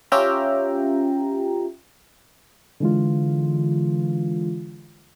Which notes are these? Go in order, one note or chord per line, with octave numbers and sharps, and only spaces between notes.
C#4 F4 G4 E5 G5 A#5
D3 E3 G#3 F4